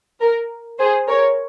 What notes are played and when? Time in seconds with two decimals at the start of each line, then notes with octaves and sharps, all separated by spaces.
0.21 A#4
0.79 G#4 C5
1.07 A#4 C#5